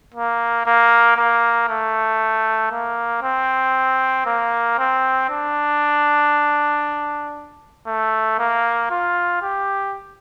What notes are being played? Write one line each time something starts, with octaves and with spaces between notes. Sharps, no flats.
A#3
A#3
A#3
A3
A#3
C4
A#3
C4
D4
A3
A#3
F4
G4